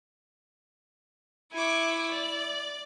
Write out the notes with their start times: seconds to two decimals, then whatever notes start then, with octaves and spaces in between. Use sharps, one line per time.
1.53 E4 G#5 C#6 D6
2.10 D5